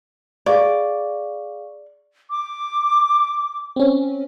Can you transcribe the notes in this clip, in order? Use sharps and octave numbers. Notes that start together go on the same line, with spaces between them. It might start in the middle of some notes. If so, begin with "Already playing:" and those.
G#4 D5 F5 C#6
D6
C4 C#4